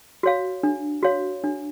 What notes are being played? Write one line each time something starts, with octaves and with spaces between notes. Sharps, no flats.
F#4 C#5 F5
D4
F#4 C#5 F5
D4